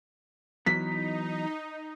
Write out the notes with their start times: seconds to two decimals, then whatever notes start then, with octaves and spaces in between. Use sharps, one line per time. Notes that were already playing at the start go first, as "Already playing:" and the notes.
0.66 E3 F#3 B3 D#4 B6